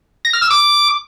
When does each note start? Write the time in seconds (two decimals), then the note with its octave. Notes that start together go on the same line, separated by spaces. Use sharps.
0.25 A#6
0.33 F6
0.42 E6
0.51 D6